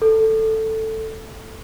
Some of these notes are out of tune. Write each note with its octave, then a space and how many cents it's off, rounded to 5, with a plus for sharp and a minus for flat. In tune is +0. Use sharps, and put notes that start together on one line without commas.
A4 +5